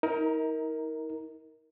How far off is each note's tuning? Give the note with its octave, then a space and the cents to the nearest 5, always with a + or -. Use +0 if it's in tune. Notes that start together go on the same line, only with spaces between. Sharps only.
D#4 +40 A#4 +0